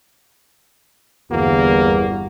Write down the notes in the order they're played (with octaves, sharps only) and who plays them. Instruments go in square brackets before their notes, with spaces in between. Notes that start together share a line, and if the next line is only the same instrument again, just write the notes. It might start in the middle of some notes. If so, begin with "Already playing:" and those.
[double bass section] G1 [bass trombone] E2 [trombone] A#3 [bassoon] F#4